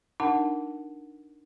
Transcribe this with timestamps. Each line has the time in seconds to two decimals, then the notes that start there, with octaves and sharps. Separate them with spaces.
0.20 D4 D#4 A#4 F#5 A5